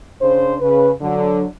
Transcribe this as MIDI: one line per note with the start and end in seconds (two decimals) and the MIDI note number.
0.21 0.56 49
0.21 0.56 62
0.21 0.56 72
0.61 0.91 49
0.61 0.91 71
1.01 1.45 50
1.01 1.45 54